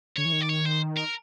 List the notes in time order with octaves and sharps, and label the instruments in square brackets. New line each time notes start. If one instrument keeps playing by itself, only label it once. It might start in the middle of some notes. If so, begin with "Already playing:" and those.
[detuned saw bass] D3 [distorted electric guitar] C#5
[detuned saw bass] E3
D#3
[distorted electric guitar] D5
C#5
C5
A#4